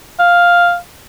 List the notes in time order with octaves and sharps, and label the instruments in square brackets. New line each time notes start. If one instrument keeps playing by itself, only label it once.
[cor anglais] F5